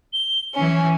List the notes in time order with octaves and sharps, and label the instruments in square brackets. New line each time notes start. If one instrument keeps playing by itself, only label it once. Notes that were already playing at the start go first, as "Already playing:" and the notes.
[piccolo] G7
[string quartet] E3 C#4 [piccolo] G#5